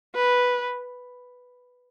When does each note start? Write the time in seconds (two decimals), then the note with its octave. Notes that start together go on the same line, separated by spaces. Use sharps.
0.15 B4